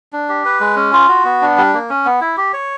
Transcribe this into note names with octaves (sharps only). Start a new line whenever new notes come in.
D4
G4
B4
G#3
C#4
F4
F#4
B3
D4
G3
A#3
C#4
B3
E4
G4
C#5